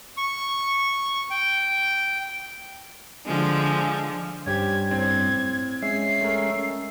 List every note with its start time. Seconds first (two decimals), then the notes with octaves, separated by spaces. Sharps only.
0.17 C#6
1.30 G5
3.25 D3 F3 G#3
4.46 G2 C#4 G4 C5 G#6
4.91 A2 C4 G#6
5.82 G#3 C#4 E5 C7
6.21 A3 A#4